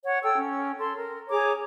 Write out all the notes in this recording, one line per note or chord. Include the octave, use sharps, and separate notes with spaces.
C#5 F#5
A4 G5 E6
C#4
A4 C6
A#4
G#4 C#5 A#5 D6